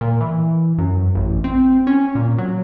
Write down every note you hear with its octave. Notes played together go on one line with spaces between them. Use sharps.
A#2
E3
F#2
A1
C4
C#4
A#2
F#3